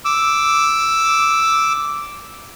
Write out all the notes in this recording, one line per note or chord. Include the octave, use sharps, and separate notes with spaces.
D6 E6